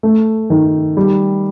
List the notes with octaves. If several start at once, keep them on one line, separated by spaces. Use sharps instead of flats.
A3
D#3
G3